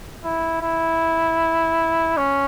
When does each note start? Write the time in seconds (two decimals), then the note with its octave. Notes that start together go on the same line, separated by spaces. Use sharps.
0.24 E4
0.62 E4
2.17 C#4